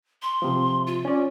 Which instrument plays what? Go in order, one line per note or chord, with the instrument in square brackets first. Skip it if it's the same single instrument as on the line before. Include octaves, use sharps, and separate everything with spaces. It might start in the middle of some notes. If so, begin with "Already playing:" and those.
[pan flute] C6
[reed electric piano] C3 F3
[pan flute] F4
[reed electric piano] C#4 D5